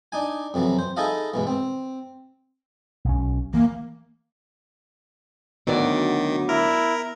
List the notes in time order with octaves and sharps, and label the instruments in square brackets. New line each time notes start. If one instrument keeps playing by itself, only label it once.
[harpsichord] D4 D#4 G#5
F2 C3 E3 F#3
C5
D#4 E4 G#4 A4 D#5 F5
G#2 B2 E3
C4
[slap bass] B1 C#4
[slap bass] E3 [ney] A#3
[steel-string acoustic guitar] D2 F#3 D5 [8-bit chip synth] D#3 [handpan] B3
[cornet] E4 [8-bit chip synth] A#4